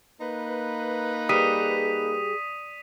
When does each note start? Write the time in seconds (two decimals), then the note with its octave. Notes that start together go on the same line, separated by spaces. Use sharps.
0.21 A#3 D#4 B4
1.29 G3 G#4 D#6 B6 D#7